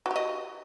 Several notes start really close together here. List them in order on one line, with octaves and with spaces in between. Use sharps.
F#4 G4 D#5